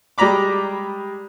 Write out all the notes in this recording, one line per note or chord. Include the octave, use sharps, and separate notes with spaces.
G3 G#3 D5 A#5 B5 D6